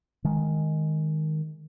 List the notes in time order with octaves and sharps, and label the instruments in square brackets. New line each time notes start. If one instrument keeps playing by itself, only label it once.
[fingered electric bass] D#3 G#3